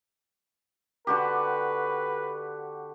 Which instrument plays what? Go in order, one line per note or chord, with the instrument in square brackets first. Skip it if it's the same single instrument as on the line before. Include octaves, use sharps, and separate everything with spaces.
[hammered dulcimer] D3 F#4 G4 [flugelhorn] B4